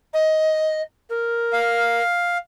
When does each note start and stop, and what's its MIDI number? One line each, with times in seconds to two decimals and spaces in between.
0.13 0.81 75
1.09 2.01 70
1.53 2.38 77